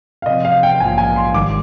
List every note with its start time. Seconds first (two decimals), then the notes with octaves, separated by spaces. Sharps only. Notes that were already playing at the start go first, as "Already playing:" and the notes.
0.22 F5
0.26 C3 F3 C4 D#5
0.45 F5
0.63 G5
0.80 A#1 G#2 F3 A#3 F4 G#5
0.98 G#5
1.16 C6
1.34 G#1 G#2 D#3 G3 D6